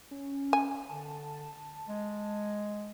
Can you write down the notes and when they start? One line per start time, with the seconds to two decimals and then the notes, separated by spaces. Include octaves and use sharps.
0.11 C#4
0.53 G#5
0.90 D3 A5
1.89 G#3